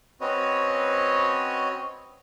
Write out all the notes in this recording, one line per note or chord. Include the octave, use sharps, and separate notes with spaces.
C4 C#4 F#4 B4 C#5 D#5